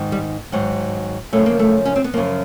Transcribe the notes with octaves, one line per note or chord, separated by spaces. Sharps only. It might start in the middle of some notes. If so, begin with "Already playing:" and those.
Already playing: G#2 D#3
G3
G#2 D#3 F#3
F#2 C#3 F3 A3
A#3
A3
C#4
C4
B3
F#2 C#3 F3 A#3